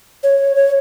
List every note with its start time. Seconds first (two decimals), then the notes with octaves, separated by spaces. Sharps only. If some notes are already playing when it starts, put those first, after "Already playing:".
0.23 C#5
0.56 C#5